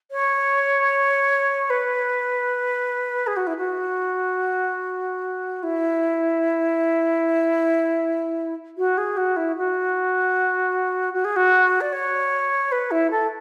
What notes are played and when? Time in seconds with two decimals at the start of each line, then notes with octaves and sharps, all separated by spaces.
0.11 C#5
1.70 B4
3.27 G#4
3.36 F#4
3.47 E4
3.57 F#4
5.63 E4
8.77 F#4
8.97 G#4
9.17 F#4
9.36 E4
9.56 F#4
11.13 F#4
11.24 G#4
11.36 F#4
11.81 D5
11.92 C#5
12.72 B4
12.91 E4
13.10 A4